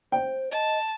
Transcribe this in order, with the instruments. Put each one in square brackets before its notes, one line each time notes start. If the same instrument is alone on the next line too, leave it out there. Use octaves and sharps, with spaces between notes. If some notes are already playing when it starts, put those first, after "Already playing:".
[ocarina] C5 [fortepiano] G5
[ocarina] D#5 [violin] A5